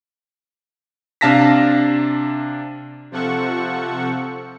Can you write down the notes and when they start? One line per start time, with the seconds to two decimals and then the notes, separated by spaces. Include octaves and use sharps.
1.21 C3 D4 F5 A5 A#6 B6
3.11 C3 F3 A4 F#5 C#6